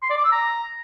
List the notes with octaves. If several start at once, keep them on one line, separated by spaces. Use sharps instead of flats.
C6
D5
D6
E6
A#5